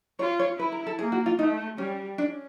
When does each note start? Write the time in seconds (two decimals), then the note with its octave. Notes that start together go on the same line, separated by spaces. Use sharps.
0.19 F4 C#5
0.39 C#5
0.59 E4 B4
0.72 A#4
0.87 A4
0.99 A#3 G#4
1.12 F#4
1.26 F4
1.39 A3 D#4
1.78 G3 C#4
2.18 C#4 D4